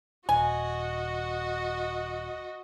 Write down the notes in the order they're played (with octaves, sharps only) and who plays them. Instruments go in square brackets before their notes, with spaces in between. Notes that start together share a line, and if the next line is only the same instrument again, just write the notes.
[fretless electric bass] D#1 [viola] F#4 D#5 [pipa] G#5